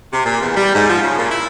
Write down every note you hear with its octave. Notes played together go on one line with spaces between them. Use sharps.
C3
A#2
E2
G3
G#2
F3
C#3
A#2
E4